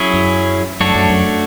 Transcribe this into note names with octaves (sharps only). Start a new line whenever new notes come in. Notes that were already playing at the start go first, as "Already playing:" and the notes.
Already playing: F#3 C#4 E4 G#4 C#5
F#2
F#2 A3 D4 F#4 C#5
F#2
F#2